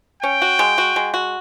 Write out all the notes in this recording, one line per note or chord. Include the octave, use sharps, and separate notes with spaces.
C#4 G5
F#4
G#3
F#4
G#3
F#4